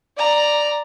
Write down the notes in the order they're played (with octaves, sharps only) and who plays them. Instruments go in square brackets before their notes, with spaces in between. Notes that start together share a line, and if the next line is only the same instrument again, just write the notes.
[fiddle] D5 A#5